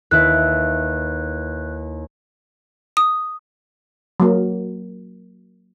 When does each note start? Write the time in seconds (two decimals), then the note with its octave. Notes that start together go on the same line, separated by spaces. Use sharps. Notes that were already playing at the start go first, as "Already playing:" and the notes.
0.11 D#2 E4 B4 F#6
2.97 D#6
4.20 F#3 A#3